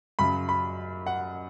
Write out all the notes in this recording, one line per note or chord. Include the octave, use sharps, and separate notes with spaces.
F#2 C#3 F#3 B5
B5
F#5